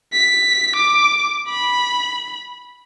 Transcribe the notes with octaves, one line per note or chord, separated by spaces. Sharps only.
B6
D6
B5